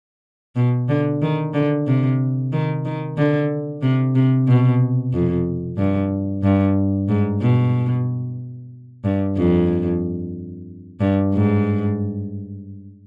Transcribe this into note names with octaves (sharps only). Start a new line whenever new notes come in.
B2
D3
D#3
D3
C3
D#3
D#3
D3
C3
C3
B2
F2
G2
G2
G#2
B2
G2
F2
G2
G#2